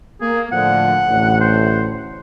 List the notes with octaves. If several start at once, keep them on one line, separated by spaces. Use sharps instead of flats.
A#3 G#4
A2 D3 F3 F#5
A1 D2 A2
C5